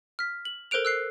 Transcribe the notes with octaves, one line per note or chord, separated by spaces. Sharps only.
F6 B6
F#7
A4 A#4 C5 F#6 D7 F7
E6 F#6 C7